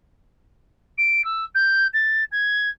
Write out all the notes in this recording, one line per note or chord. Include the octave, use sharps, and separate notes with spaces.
D7
E6
G6
A6
G#6